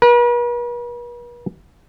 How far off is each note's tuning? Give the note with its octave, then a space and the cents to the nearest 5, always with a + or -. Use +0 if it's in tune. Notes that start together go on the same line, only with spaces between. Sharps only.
B4 -45